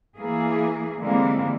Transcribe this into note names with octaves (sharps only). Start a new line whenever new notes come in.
E3 A#3 G#4
D3 E3 G3 G#3 A#3 C4